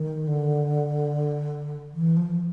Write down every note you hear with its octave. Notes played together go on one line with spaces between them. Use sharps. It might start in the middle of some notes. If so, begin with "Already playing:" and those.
Already playing: D#3
D3
E3
F3